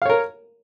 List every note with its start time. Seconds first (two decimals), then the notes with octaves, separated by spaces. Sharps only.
0.02 F5
0.06 C#5
0.09 A#4